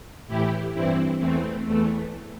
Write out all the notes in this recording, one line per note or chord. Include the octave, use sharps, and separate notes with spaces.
A2 E3 E4 G4
G2 E3 C4 E4
E2 E3 A3 C4
E2 E3 A3